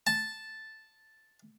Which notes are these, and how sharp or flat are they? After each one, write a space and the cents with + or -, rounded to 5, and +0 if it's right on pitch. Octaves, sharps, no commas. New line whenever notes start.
A5 +0